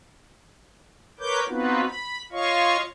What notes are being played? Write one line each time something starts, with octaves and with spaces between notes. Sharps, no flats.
A#4 B4 C#5 D6 G6
B3 C4 D#4 F4 F#4 B4
B5
F4 C#5 D#5 F5 C#6